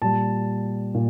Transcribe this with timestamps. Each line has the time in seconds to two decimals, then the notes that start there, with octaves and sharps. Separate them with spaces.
0.01 A#2 G3 A5
0.94 A#2